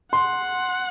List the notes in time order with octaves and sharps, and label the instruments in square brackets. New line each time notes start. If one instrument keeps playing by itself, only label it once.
[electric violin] F#5 [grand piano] C6